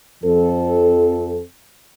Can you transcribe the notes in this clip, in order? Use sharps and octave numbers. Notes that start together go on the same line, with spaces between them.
F2 F3 C4 A4